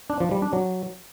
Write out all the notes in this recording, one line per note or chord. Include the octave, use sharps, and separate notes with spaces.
D4
F3
G3
D4
F#3